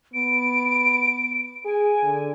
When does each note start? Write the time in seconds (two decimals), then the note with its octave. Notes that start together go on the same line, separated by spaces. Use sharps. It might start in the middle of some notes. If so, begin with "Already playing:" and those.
0.14 B3 D7
1.65 G#4 G#5
2.03 D3